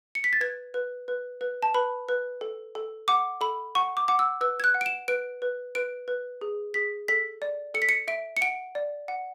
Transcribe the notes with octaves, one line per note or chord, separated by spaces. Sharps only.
C#7
B6
A6
B4 G#6
B4
B4
B4
A5
B4 B5
B4
A4
A4
F#5 D6
A4 B5
F#5 C#6
D6
F#5 D6
E6
B4 E6
G#6
F#6
F#5
D7
E7
B4 D7
B4
B4 D7
B4
G#4
G#4 B6
A4 B6
D5
A4 C#7
B6
C#7
E5 D7
C#7
F#5 D7
D5
F#5